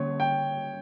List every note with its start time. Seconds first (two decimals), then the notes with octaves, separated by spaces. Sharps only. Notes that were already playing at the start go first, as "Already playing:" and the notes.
Already playing: D3 G3 A#3 C#4 C#5
0.20 G5